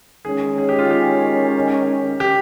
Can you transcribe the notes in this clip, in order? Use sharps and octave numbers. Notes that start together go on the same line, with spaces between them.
D#3 G#3 C#4 G#4
G#4
G4
F4
G4
G4